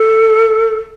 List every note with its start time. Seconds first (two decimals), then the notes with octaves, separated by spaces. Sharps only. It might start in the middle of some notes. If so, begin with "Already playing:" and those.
Already playing: A4